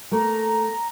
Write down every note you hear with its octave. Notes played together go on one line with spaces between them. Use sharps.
A3 A#3 A#5